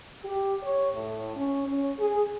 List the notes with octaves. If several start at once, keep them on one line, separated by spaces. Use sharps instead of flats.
G4
C#5
A2
C#4
C#4
G#4